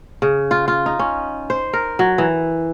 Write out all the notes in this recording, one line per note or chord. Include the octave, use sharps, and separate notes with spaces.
C#3
F4
F4
D#4
C#4
C5
A#4
F#3
E3